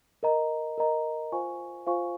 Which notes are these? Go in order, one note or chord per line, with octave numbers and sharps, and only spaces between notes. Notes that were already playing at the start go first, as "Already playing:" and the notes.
A#4 D#5 A#5
A#4 D#5 A#5
F4 C5 F5 G#5 C#6
F4 C5 F5 G#5 C#6